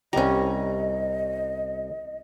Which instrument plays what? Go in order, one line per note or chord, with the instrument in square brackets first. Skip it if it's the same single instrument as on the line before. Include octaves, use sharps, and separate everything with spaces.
[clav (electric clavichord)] C2 A#5 [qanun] G3 C#4 [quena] D#5